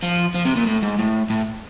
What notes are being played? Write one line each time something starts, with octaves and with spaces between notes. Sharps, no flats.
F3
F3
C3
A#2
A2
G#2
A2
A2